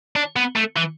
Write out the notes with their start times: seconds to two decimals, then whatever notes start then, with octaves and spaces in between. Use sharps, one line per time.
0.16 D4
0.36 B3
0.56 A3
0.76 E3